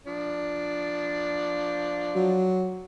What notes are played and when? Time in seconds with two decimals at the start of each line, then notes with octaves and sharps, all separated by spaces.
0.06 F3 D4
2.16 F#3